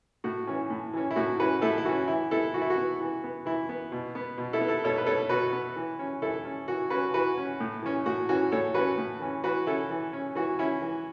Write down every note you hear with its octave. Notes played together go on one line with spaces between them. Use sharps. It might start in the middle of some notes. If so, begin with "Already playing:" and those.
A2 F#4
E3 C#4
A2
E3 C#4
E4
A2 F#4
E3 C#4 F#4 B4
A2 E4 A4
E4
E3 C#4 F#4
E3 E4
B3 E4 A4
E3 F#4
E4
F#4
B3
E3
B3
E3 E4
B3
B2
B3
B2
E4 A4
B3
E4 A4
B2 A4 C#5
B4
B3 A4 C#5
B2 F#4 B4
B3
E3
C#4
E3 E4 A4
C#4
E3 F#4
C#4 F#4 B4
E3 F#4 B4
C#4
A2
E3 C#4
A2 F#4
E3 C#4 F#4
A2 A4 C#5
E3 C#4 F#4 B4
A2
E3 C#4
E3 F#4 B4
C#4 E4 A4
E3
C#4
E3 F#4
C#4 E4
E3